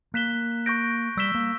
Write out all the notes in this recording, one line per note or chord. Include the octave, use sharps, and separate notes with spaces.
A#3 F#6 B6 E7 G7
C#6 G6 A#6 D7
G3 E6 B6 E7 G7
A#3